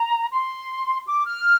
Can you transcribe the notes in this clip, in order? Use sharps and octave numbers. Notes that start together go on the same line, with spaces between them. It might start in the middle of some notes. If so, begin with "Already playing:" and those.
Already playing: A#5
C6
D6
F6